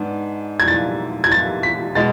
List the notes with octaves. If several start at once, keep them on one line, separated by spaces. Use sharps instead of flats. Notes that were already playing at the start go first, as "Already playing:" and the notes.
Already playing: G#2 B3 D4
G#6
A6
G#6
A6
B6
B2 G#3 A6